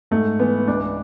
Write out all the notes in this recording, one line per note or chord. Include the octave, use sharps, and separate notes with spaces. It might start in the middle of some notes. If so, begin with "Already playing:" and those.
G#2 A3
E3 B3
C#2 D4